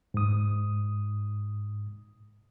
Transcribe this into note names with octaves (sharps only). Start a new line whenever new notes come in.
G#2 D#6